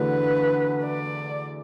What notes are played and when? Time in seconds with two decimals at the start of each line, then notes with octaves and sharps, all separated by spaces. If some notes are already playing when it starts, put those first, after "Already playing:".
Already playing: E2 D3 A3 D4 F#4 B4
0.84 D5